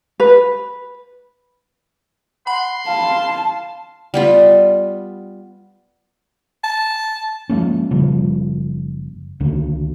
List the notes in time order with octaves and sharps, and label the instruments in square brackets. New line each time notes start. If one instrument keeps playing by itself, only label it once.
[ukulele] B4
[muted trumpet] F#5 [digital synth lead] B5 [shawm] C6
[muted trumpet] F5 [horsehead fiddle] A5
[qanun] G3 B3 F4
[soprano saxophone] A5
[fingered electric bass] F3 G#3 A#3 C#4
F#1 C#3 F3 G3
C#2 D3 D#3